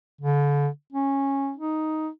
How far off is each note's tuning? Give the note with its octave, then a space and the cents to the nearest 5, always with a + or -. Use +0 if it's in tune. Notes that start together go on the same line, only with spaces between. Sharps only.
D3 -35
C#4 -15
D#4 +5